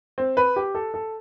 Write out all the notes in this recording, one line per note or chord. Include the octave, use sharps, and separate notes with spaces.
C4
B4
G4
A4
A4